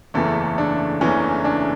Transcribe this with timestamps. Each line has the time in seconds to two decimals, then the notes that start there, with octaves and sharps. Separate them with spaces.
0.14 F#1 E2 C#3 E3 A3 A4
0.58 D4
1.01 F#1 E2 C#3 E3 C#4
1.45 D4